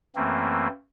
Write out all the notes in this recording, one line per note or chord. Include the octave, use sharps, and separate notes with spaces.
F#2 E3 A3 A#3 C4